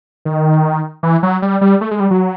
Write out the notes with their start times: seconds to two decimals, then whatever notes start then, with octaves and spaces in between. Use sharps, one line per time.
0.25 D#3
1.03 E3
1.23 F#3
1.42 G3
1.61 G3
1.81 A3
1.91 G#3
2.00 G3
2.11 F#3